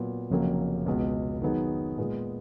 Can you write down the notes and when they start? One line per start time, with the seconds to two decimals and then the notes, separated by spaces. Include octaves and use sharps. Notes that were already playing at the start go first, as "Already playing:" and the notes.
Already playing: A#2 F#3 B3
0.30 F1 F2 C#3 F#3 A#3
0.86 C#2 B2 G#3 B3 F#4
1.42 D#3 F#3 B3 D#4 G#4
1.98 A#2 G#3 B3 F4 G#4